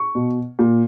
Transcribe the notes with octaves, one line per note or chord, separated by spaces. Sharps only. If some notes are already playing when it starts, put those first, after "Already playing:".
Already playing: C#6
B2
A#2